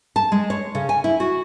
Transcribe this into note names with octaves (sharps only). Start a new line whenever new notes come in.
A5
G#3
C#5
C#3
G#5
E4
F#4